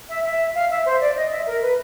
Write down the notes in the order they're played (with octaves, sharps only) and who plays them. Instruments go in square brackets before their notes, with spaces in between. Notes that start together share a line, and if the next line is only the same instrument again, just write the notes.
[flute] E5
E5
F5
E5
C5
D5
D#5
E5
A#4
B4